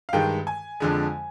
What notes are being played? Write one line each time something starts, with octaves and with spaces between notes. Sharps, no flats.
F5
G2 D#3 G#3 G5
G#5
F2 D3 G#3